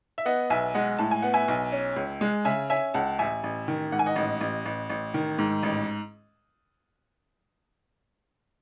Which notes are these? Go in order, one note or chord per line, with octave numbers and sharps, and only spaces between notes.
E5
B3 D#5 F#5
B1 E5 G#5
G#3 D#5 F#5
A2 A5
G#5
B3 F#5
E5 G#5
B1
C#4
C#2
G#3
C#3 E5 G#5
C#4 E5 G#5
C#2 F#5 A5
A1 E5 G#5
A1
D#3
G#2 F#5
G#5
D#5 F#5
A1
A1
A1
A1
D#3
G#2
A1